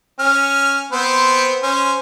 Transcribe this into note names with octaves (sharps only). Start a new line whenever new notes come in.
C#4 F6
B3 C4 C5
C#4 C5